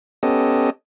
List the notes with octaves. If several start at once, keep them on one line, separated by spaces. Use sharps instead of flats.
B3 C#4 G4 A4 D#5